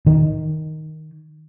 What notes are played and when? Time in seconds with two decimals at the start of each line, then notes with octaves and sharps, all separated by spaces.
0.06 D#3